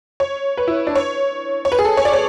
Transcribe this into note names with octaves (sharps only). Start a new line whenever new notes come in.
C#5
B4
E4
D4
C#5
C#5
B4
G#4
A4
C#5
D5
C#5